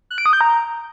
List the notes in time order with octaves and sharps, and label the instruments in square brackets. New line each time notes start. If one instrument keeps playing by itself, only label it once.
[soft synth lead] F#6
D7
D#6
G6
A#5